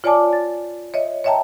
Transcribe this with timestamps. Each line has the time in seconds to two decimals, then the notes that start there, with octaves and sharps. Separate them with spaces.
0.04 F4 C#5 D5 G#5 A5 D6
0.33 A6
0.94 C#5 D#5 E5
1.24 C#5 D#5 E5 G5 A5 A#5